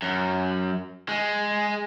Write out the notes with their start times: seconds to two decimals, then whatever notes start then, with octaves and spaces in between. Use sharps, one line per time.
0.02 F#2
1.09 G#3